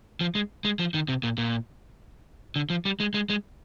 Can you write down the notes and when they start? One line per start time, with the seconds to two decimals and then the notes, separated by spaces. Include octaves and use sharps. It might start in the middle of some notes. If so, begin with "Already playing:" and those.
0.21 F3
0.35 G#3
0.65 G#3
0.79 F3
0.94 D#3
1.08 C3
1.23 A#2
1.38 A#2
2.56 D3
2.70 F3
2.85 G3
3.00 G#3
3.14 G#3
3.29 G#3